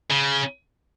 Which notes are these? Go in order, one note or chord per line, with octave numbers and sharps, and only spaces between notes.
C#3